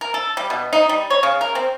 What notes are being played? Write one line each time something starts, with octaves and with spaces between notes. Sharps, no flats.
A#4
A4
G3
B2
D#4
G3
C#5
C#3
A#4
C4